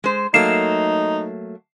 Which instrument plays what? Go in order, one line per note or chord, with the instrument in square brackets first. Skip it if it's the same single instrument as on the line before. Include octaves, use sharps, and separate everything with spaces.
[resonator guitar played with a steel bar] G#3 C5
[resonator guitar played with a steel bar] F#3 A3 A#3 [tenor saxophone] D#4 [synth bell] C7 E7